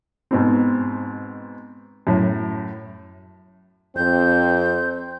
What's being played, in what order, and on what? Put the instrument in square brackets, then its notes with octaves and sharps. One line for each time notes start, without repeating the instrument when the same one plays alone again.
[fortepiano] G#2 B2 C4
F#2 A2
[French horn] F2 [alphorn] C4 [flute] G6